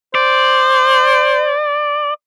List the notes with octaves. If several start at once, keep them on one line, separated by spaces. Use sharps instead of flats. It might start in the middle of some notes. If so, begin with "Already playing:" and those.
C5 D5